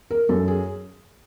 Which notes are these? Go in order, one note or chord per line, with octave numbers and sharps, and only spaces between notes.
A#4
F#2 A4
G#4